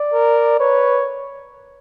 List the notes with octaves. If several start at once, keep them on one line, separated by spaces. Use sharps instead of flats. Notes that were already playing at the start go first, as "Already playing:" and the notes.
Already playing: D5
A#4
B4 C#5